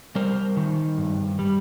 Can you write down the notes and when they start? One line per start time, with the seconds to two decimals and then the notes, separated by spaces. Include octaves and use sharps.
0.15 G3 A#4 C5
0.57 D#3
0.98 G2
1.39 G3